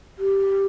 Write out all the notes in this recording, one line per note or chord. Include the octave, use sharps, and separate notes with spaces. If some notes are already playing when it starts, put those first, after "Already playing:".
G4